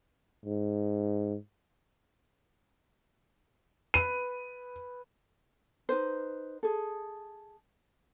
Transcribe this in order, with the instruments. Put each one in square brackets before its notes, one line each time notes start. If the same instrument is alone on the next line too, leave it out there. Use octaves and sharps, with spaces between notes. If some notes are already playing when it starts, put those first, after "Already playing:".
[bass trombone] G#2
[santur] B4 [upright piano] D#7
[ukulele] D#4 B4 C5
G#4 A4